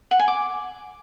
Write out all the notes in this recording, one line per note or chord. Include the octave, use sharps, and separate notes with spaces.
F#5
G#5
D6